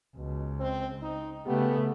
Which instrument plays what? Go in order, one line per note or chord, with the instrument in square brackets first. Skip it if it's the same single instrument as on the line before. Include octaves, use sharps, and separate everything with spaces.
[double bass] C#2 [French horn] B2
[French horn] C4
D#4
[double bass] C#3 A3 [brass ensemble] B3 [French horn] G4